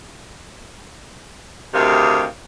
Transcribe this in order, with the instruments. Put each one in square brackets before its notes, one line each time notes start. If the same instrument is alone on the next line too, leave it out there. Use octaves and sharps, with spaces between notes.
[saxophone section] D2 C3 D#3 G4 F5